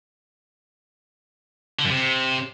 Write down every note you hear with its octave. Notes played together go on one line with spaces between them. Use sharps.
D3
F#2
C3